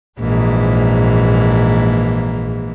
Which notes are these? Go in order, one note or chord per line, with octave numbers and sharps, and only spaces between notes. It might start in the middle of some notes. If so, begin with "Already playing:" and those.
A#1 G#2 E3 A#3